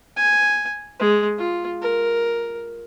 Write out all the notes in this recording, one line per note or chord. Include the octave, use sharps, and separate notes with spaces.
G#5
G#3
F4
A#4